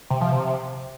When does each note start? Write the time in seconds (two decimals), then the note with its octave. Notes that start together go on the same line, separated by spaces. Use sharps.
0.10 C3
0.21 F3
0.32 C3